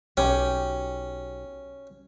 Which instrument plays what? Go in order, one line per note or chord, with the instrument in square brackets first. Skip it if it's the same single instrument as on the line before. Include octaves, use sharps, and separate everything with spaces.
[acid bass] B1 [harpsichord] C#4 [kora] G4